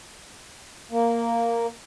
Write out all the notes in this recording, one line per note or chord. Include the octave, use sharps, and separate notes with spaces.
A#3